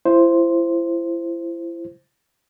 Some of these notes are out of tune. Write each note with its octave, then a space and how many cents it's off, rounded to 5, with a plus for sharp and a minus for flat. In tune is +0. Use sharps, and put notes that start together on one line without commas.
E4 +35 C5 +0